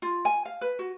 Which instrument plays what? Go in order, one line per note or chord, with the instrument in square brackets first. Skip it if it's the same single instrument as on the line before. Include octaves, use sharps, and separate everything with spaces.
[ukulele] F4
G#5
F5
B4
F#4